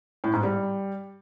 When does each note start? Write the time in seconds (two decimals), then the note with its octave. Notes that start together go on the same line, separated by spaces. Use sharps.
0.24 A2
0.33 G#2
0.43 G3